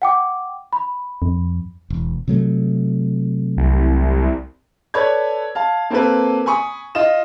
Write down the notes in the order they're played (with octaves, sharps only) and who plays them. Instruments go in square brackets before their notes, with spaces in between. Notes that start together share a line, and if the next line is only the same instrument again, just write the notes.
[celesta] F#5 G5 D6
B5
[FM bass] F2
[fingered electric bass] E1
C3 F#3 A3
[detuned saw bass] C2
[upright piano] A4 B4 C#5 D5 B5 G#6
F5 A5
A#3 C4 F4 A4 B4
G#5 B5 C#6 D#6
F4 D#5 E7